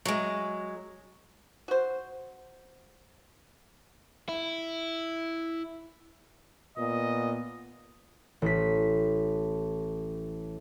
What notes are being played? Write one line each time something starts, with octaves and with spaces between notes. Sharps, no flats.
F#3 G#3
F#4 C5
E4
A#2 B3 D#5
A1 B6